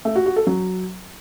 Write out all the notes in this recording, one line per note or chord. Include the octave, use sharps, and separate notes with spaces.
A3
F#4
F#4
A4
F#3